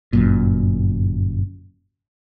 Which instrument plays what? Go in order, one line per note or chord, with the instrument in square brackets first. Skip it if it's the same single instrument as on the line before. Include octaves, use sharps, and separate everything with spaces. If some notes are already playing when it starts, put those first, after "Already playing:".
[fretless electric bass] G1 F#2 A#2